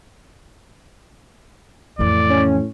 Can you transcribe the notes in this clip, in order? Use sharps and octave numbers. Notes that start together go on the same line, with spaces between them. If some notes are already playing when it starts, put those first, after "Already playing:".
F2 A2 E3 D5
C#4